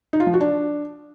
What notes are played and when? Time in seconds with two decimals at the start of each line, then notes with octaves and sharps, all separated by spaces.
0.13 D#4
0.20 F4
0.27 F3
0.34 F#4
0.40 D4